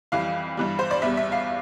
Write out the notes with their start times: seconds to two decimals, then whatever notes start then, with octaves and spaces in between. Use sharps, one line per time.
0.12 F2 E3 G3 F5
0.57 G2 E3 G3
0.79 C5
0.91 D5
1.02 E2 B2 G3 E5
1.17 E5
1.32 F5